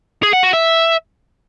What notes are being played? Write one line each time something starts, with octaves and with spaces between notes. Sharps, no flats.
G#4
F#5
F#4
E5